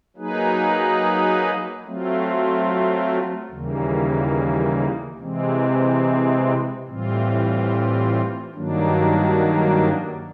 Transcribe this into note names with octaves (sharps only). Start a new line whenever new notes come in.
F#3 A#3 D#4 G#4 B4
F#3 A3 C4 F4
D#2 C#3 E3 G3 A#3
C3 E3 G#3 C4
A2 E3 G3 C4 F4
G2 D#3 F#3 A#3 D4